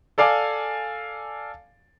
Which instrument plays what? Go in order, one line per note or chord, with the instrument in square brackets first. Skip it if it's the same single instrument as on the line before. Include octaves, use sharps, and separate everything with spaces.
[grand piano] A4 D5 F5 G#5 D6